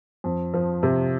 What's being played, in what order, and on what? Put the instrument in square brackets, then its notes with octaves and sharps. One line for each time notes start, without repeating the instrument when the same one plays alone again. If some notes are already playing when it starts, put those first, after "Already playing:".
[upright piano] F2
F3
C3